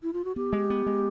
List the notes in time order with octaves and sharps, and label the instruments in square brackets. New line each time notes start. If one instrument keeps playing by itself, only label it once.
[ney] E4
F4
F#4
[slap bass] B3 [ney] G4
[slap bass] G#3
B3
G#3